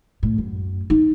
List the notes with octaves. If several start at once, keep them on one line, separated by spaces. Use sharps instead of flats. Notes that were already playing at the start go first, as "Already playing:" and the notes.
A2
F#2
D#4